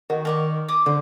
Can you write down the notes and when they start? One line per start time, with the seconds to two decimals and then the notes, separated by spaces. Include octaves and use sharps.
0.10 D#3 F#4
0.25 A#4 D5 C#6
0.68 D6 D#6
0.86 D3 C5